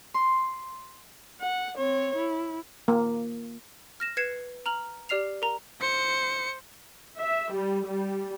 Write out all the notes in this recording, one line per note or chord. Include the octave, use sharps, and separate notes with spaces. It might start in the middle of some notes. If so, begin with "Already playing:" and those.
C6
F#5
C4 C#5
E4
A#3
F6 A#6 E7
B4 G#6 C7 C#7 E7
A#5 F6 F#7
G4 D5 F6 C7 F7
A#4 A#5
C5 C#7
E5
G3
G3